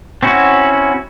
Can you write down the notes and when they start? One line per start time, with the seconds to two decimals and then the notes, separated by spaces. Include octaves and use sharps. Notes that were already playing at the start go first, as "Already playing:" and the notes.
0.23 C4 C#4 E4 F#4